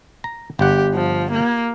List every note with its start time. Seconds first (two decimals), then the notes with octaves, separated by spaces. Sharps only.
0.24 A#5
0.59 G1 G4 F#5
0.94 F3
1.31 A#3